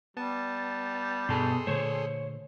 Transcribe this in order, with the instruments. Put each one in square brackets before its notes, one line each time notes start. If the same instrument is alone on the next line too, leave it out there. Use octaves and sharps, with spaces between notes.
[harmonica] G3 [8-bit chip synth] B3 A5
[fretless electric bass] G2 [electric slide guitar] B2 A5 [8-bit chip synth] G#4 A4 C6
[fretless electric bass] A#2 D3 A3 [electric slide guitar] C5 C#5